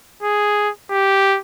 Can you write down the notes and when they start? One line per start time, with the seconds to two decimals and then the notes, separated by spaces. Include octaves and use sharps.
0.23 G#4
0.91 G4